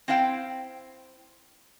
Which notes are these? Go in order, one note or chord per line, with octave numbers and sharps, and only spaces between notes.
C4 E4 C5 F5 G5